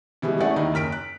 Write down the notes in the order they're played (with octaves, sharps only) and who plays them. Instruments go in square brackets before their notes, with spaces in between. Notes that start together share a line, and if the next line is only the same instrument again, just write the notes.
[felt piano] B2 E3 G3 G#3
A3 C#4 E4 G#4 D5 F#5
D#2 D#3 D#4 E4
F#1 F6 B6 D7
F#6